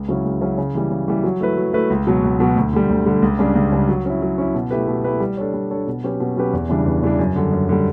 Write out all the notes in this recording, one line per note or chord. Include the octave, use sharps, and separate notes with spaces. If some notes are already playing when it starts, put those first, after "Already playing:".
Already playing: C#2
C#3 F#3 C#4 E4
C#2
C#3 F#3 C#4 E4
C#3
E3 G3
C#3
E3 G3
F#3
A3 E4 B4
F#3
A3 E4 B4
C#2
B2 F#3
C#2
B2 F#3
D2
D3 G3
D2
D3 G3
C#2
C#3 G3 D4
C#2
C#3 G3 D4
F#3
C#4 E4
F#3
C#4 E4
B2
A3 E4 G4 B4
B2
A3 E4 G4 B4
G3
D4 A4 C#5
G3
D4 A4 C#5
B2
F#3 C#4 G4 B4
B2
F#3 C#4 G4 B4
E2
C#3 E3 G3 D4
E2
C#3 E3 G3 D4
F#2
D3 G3
F#2
D3 G3